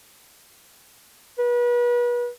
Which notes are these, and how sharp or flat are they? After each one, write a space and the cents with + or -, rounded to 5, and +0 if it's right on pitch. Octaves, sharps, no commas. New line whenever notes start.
B4 -35